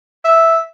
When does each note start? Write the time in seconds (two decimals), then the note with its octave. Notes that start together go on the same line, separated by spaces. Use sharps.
0.25 E5